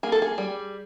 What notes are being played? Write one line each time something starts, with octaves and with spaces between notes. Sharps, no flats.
A#3 G#4
A4
G#4
G3